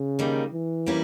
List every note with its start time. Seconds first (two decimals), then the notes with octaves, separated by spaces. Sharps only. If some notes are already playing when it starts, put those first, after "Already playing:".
Already playing: C#3
0.19 D#3 G3 A#3 D#4
0.52 E3
0.86 G3 A#3 C#4 E4